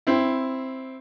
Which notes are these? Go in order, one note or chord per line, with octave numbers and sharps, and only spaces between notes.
C4 E4